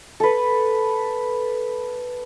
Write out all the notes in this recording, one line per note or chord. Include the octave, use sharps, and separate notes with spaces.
A4 B4